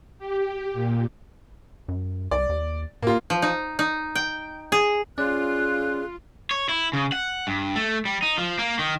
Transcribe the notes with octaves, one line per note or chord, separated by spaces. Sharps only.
G4
A#2
F#2
C2 D5
D#2
A2 A#3 F4
F3
D#4
D#4
G5
G#4
C#4 F4 G#4 D5 F#6
C#5
E4
C#3
F#5
G2
A3
G3
D#4
F3
A#3
D#3